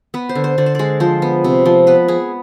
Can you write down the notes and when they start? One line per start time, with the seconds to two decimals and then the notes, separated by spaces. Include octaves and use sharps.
0.14 B3 B4
0.29 C5
0.35 D3
0.44 C5
0.58 D3 D5
0.66 C5
0.75 G#3 D5
1.00 F3 C5
1.22 B3
1.44 C3
1.65 F3
1.87 B3 B4
2.08 B3 G#4